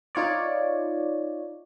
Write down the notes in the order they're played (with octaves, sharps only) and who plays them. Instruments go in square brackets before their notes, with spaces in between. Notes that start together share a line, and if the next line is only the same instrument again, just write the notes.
[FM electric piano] D#4 F4 C#5 D5